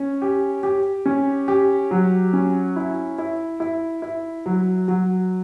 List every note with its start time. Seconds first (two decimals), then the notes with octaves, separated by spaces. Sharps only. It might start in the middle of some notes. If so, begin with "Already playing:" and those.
Already playing: C#4
0.22 G4
0.63 G4
1.06 C#4
1.48 G4
1.91 F#3
2.33 C#4
2.76 E4
3.18 E4
3.60 E4
4.02 E4
4.46 F#3
4.88 F#3